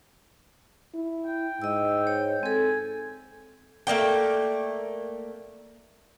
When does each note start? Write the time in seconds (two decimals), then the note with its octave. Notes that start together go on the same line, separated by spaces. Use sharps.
0.94 E4
1.25 G5
1.62 G#2 D#5 E6
2.07 C#5
2.43 C4 A4 G#5
3.87 A3 A#3 D5 G5